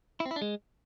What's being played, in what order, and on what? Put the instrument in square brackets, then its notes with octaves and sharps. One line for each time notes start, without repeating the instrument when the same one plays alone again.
[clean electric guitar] E4
C4
E4
D4
G#3